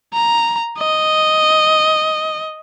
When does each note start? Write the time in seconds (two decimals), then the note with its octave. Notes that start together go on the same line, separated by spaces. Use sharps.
0.14 A#5
0.78 D#5